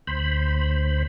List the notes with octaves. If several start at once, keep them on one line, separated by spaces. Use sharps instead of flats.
D2 C5 B5